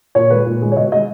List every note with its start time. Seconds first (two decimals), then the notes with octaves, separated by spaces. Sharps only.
0.15 A#2 C#5
0.30 G#3 B4
0.46 A#2
0.62 G#3
0.72 C#5
0.77 B2 D#5
0.92 G#3 D#5